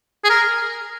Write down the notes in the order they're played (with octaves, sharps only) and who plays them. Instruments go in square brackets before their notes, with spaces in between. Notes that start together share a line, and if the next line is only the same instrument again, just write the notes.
[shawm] G#4
A#4